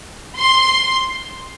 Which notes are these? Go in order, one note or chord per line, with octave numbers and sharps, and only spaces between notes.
C6